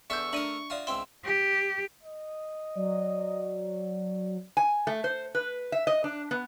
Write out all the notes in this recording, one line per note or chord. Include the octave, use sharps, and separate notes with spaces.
E2 D4 A4 E5 C#6 E6 G6
A3 D4 A#4 D5 D#7 F#7
F4 F#4 D5 E5 D#6
C#2 C4 E4 C6
G4
D#5
F#3 D5
G#5
A3
C5
B4
E5
D#5
D4
B3